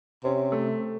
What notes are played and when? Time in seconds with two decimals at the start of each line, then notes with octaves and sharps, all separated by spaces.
0.24 C3 C#4
0.52 A3